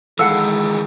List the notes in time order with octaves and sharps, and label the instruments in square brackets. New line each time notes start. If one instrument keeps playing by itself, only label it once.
[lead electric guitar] D#3 E3 [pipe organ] G#3 [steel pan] A4 F5 F#5 [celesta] E6 C#7